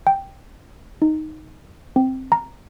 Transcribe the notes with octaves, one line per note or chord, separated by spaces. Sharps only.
G5
D#4
C4
A#5